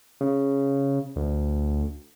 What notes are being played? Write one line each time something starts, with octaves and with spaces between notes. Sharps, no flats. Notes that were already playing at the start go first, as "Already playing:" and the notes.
C#3
D2